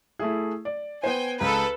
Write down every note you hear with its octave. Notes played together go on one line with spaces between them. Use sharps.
A3 E4 G#4
D5
B3 C5 G5 G#5
C#2 G#4 A4 B4 A#5